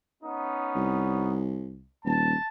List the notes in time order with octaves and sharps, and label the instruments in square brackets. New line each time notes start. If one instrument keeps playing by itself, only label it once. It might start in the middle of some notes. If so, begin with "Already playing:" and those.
[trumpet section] B3 C#4 D#4
[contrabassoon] C2
[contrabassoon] D#1 [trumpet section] A5